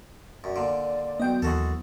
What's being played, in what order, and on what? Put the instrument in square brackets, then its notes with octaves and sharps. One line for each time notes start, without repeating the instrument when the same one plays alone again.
[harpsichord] F#2 [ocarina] D5
[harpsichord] A#2 D3
[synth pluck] F#3 B3 [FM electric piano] D#5 G5
[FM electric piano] D#2 [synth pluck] E3 [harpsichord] G#3 F#4 A4